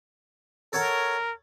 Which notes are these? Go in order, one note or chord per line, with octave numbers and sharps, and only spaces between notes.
A4 A#4 C#5 F#5